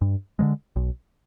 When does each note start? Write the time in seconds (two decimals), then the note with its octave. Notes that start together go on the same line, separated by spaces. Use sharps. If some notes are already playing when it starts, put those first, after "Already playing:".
0.01 G2
0.39 D3 F3 G#3
0.76 B1